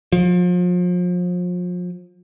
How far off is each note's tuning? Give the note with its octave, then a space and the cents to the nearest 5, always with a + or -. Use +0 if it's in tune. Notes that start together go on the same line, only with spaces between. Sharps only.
F3 +35